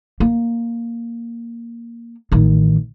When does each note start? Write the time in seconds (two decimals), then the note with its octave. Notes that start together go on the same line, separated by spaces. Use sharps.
0.20 A#3
2.32 A1 D#3